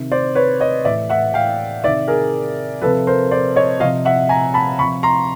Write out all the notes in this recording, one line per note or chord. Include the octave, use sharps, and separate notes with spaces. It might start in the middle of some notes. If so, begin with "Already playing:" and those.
Already playing: C3 D#3
C5 D5
B4 C#5
C#5 D#5
A2 E3 D5 E5
E5 F#5
F5 G5
C3 D#3 D5 E5
G#4 A#4
C3 F3 A4 B4
A#4 C5
C5 D5
C#5 D#5
C3 F3 D#5 F5
E5 F#5
G#5 A#5
A5 B5
C3 F3 B5 C#6
A#5 C6